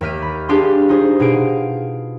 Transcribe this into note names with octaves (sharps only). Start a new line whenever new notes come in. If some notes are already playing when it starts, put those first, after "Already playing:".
D#2 A#3 E5 F6 G6 D#7
B5
D4 G4 G#4 F5 C6
D#4 F4 G#4 C5
B2 G#4 F5 D7